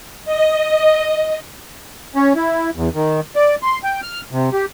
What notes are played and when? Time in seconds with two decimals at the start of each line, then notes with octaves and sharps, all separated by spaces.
0.25 D#5
2.16 C#4
2.36 E4
2.76 E2
2.94 D#3
3.36 D5
3.63 C6
3.83 G5
4.02 F6
4.32 C3
4.53 G4